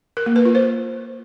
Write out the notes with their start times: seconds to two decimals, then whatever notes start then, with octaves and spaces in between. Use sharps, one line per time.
0.17 A#4
0.26 A#3
0.36 B4
0.45 F4
0.55 C5